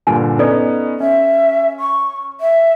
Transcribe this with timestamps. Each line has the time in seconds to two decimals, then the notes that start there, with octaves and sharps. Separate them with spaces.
0.07 G2 A#2 D3 G#5
0.39 B3 C#4 D#4 A4 D5
1.00 C#4 E5
1.80 C#6
2.41 E5